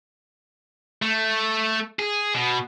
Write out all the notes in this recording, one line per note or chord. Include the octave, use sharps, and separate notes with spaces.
A3
G#4
B2